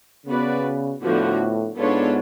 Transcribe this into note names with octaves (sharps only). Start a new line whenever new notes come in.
C#3 B3 F#4 B4 D5
A2 D3 F3 B3 F#4
G#2 B3 D4 F4 A4 C#5